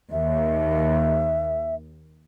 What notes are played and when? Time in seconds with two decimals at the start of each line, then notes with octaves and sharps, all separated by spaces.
0.11 D#2 E5